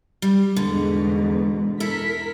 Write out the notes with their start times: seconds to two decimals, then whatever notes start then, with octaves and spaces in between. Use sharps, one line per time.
0.22 G3
0.56 E2 G#2 B2 D3
1.80 E4 A4 A#4 B6